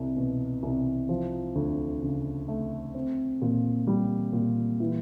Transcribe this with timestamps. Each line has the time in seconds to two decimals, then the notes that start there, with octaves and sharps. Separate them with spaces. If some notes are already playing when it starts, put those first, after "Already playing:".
Already playing: C2
0.17 B2
0.63 C2
1.09 F3
1.55 D2
2.02 C#3
2.48 A3
2.95 C4
3.42 A#2
3.87 G3
4.33 A#2
4.80 E3